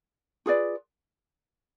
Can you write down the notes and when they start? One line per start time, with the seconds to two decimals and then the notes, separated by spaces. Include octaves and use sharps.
0.46 F4 G#4 B4 D5